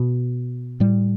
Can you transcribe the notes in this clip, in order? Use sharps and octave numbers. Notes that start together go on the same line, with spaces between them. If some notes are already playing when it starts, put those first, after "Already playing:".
Already playing: B2
A2 G3